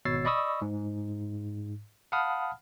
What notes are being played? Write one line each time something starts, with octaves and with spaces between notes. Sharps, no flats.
G#1 B2 C#5 E6 A6 C7
D5 D#5 B5 C#6 D#6 E6
G#2
F5 F#5 A5 B5 D#6 F6